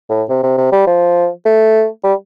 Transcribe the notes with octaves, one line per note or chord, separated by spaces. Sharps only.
A2
C3
C3
C3
G3
F3
A3
G3